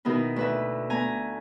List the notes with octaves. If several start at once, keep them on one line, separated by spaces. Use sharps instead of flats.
B2 D#3 B3 D#4 E4
D2 B4 E5
A3 B3 G#5 A#5